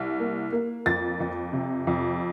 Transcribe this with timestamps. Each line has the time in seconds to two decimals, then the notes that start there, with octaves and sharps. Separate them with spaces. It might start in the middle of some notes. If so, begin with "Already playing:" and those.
Already playing: C2
0.20 A#3
0.53 A#3
0.86 F2 A6
1.20 F2
1.53 C3
1.87 F2